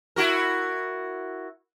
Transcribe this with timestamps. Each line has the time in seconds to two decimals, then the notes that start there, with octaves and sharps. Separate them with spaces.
0.16 E4 F#4 A#4